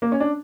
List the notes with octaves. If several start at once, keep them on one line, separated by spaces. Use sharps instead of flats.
A#3
C#4
D4